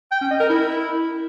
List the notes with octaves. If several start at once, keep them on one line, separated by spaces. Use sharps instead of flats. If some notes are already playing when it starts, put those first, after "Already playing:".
G5
C#4
D#5
A#4
E4